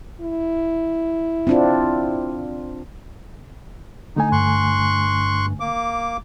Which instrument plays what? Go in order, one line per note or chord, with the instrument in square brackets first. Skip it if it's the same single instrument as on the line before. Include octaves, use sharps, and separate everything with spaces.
[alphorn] E4
[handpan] C4 D4 F4
[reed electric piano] D3 A3 G#5 [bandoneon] D#4
[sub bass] G2 [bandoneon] C6 C#6 F#6
[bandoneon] A#3 D6